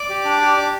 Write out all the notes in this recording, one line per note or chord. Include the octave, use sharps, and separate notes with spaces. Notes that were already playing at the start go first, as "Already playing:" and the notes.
Already playing: D5 D6
G4
D4
G4
D4